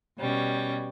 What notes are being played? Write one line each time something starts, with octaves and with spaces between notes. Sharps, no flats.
B2 G3 C#4